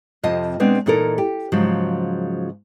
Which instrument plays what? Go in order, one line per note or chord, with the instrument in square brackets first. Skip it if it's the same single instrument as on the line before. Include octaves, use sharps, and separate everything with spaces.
[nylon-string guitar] F2 C3 F4 D#5 A5
B2 G#3 B3 C4 D4
A#2 E3 D#4 A4 A#4
G4
G#2 C#3 F3 F#3